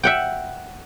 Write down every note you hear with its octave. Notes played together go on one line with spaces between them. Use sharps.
E5 F#5 G5